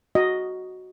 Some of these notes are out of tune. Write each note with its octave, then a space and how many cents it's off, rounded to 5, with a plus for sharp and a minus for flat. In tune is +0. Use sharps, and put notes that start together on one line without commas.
F#4 +0 D#5 +0